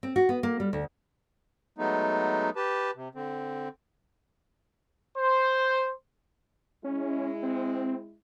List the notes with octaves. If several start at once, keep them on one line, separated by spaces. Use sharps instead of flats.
C4
F#4
B3
A#3
G3
D2
F#3 G#3 A3 B3 D#4
G4 B4 A5
C3
D3 C4
C5
G#3 C#4 E4
C4